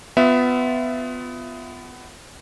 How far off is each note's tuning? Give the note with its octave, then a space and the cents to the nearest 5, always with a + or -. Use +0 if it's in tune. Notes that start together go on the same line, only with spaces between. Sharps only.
B3 +20 F4 +0 E5 +0